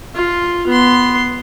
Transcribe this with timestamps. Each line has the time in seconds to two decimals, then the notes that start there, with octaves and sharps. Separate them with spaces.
0.15 F4
0.67 B3 C6